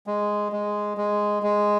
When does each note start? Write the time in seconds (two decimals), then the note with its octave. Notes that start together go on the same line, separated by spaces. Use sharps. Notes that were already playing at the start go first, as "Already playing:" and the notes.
0.07 G#3
0.52 G#3
0.97 G#3
1.43 G#3